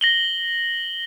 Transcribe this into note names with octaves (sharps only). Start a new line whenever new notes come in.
A#6 F#7 G7